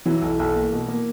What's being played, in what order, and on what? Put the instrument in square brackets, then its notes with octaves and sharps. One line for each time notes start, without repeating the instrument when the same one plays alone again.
[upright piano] E3 [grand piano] F#3
[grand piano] B1
B1
A#3
B2
A#3